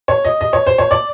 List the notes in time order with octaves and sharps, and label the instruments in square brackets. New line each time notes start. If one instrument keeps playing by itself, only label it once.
[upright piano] C#5
D#5
D#5
C#5
C5
C#5
D5